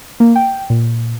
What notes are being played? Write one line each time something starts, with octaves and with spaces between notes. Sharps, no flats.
A#3
G5
A#2